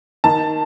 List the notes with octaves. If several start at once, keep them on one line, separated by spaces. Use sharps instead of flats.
D#3 A5